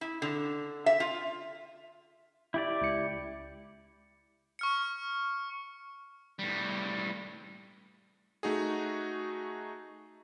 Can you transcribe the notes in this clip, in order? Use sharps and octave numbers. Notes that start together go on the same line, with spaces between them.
E4
D3
E5
F4
E4 G4 D5
C#2 C#7
C#6 F6 C#7
A2 G3
A3 D#4 F#4 G#4